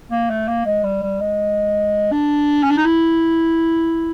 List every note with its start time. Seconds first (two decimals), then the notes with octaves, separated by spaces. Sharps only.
0.11 A#3
0.30 A3
0.48 A#3
0.66 G#3
0.84 G3
1.02 G3
1.20 G#3
2.12 D4
2.63 C#4
2.70 D4
2.77 D#4
2.84 E4